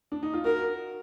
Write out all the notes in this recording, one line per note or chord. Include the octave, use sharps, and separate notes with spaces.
D4
D#4
F4
F#4 A#4